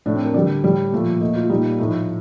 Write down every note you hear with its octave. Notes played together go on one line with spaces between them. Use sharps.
A2 A3 D4
C4
A#4
D3 G3 D5
A2 G3
A#2 F3 A3
A#2 A3 D#5
F4
A#2 G3 D#4
A2 F3 A3 D#4